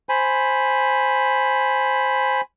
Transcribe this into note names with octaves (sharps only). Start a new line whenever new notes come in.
C5 G#5 B5